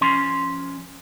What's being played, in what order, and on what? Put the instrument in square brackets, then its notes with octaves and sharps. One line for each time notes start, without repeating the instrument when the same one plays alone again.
[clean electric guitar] F3 C#4 C6